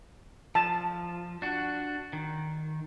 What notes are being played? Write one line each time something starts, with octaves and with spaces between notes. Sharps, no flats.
F3 A5
D4 F#4
D#3